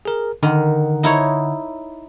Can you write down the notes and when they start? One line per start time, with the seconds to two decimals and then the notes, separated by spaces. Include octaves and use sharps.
0.05 G#4 A#4
0.43 D3 D#3 F#5
1.03 D#4 E4 C#5